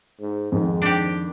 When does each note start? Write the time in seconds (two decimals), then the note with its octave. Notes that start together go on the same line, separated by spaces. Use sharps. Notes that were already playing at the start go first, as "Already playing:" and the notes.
0.21 G#2
0.52 F2 G#2 D#3
0.82 D4 G4